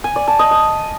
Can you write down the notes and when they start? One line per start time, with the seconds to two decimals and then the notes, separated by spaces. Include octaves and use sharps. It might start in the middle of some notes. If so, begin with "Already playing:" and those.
0.04 G#5
0.16 D5
0.28 A5
0.39 D#5
0.51 D#5